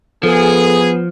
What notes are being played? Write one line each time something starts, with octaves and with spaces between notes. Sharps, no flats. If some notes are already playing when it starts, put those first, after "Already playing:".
F3 B3 G#4 A4